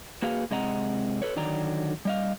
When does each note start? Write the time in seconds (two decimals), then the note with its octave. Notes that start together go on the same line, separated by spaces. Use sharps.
0.22 A#3 F#4 G#4 B4 F5
0.51 C3 G#3 C4 D#5 F#5 A#5
1.22 A4 B4 C#5
1.36 D3 D#3 F#3 D5 A#5
2.05 G3 D#5 F5